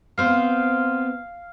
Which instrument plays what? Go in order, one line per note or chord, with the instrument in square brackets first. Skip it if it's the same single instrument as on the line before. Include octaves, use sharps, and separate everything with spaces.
[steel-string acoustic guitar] B3 C4 C5 [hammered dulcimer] F5